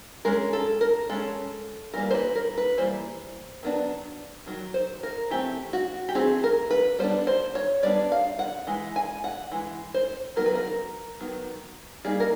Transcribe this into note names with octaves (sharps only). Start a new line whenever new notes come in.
G#3 C#4 A#4
A4
A#4
G#3 C#4 A4
E3 G3 A#3 A#4
C5
B4
A#4
B4
E3 G3 A#3 C5
D#3 F#3 B3 D4
D#3 F#3
C5
A#4
E3 A3 C4 G4
F#4
G4
E3 A3 C4 G#4
A#4
B4
G3 B3 D4 C5
C5
C#5
G3 B3 D4 D5
F5
F#5
E3 G#3
G#5
F#5
E3 G#3
C5
D#3 F#3 B3 A#4
B4
A#4
D#3 F#3 B3
G3 A#3 D#4 G#4
A#4